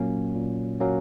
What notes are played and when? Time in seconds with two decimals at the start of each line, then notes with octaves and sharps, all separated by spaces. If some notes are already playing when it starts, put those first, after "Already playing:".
Already playing: A#2 F#3 A#3 C#4
0.35 A#2
0.80 F#3 A#3 C#4